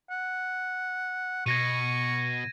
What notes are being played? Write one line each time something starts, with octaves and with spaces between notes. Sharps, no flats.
F#5
B2 C#6 G#6 A#6 D#7